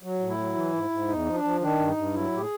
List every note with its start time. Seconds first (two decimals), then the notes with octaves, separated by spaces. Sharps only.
0.03 F#3
0.20 A2
0.29 E4
0.38 F#3
0.55 E3
0.73 G#2
0.90 G#2
1.08 E2 D#4
1.26 F3
1.34 D4
1.44 F3
1.61 D#3 D4
1.79 G2
1.87 D#4
1.96 G2
2.14 F#3 E4
2.32 A2 G4
2.40 G#4